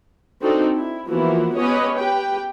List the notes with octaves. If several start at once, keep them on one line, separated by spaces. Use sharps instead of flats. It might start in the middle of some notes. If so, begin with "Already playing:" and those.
C4 D4 D#4 F#4 A4
E4
E3 F3 A#3 B3 E4 F#4
B3 C#4 G4 B4 C#5 D#5
G4 B4 G5